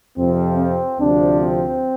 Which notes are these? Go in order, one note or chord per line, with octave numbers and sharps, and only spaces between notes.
F2 C3 F3 C4
C4
D2 C3 F3 D4
C4